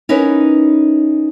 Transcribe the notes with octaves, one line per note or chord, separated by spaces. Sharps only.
C#4 D#4 E4 A#4 B4 C#5